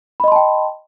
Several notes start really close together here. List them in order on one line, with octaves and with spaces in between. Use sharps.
B5 D#5 C6 A5 G5